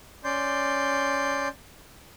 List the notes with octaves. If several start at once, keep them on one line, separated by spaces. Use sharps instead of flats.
C#4 D5 C6 G6